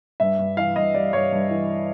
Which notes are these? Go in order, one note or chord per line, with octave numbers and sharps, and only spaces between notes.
G2 E5
G2
E3 F5
G2 D#5
G3 D5
G2 C#5
G2
E3